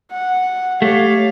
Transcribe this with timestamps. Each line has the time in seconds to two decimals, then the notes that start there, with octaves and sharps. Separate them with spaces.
0.12 F#5
0.82 A3 G4 C#5 F5